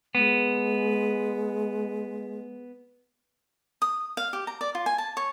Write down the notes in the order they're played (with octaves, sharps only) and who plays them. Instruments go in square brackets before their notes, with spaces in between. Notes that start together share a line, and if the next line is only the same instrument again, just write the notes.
[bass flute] G#3 [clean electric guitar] B3
[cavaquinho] D#6
F5
G4
A#5
D5
F4
G#5
A5
C#5